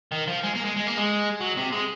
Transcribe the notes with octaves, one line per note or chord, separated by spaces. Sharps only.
D#3
F3
G#3
A#3
G#3
G#3
A#3
G#3
F#3
C3
G#3